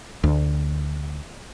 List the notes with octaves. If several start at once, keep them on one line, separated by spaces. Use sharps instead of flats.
D2